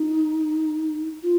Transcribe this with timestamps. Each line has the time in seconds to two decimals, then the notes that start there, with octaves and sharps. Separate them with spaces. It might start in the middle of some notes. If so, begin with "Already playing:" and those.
Already playing: D#4
1.23 F4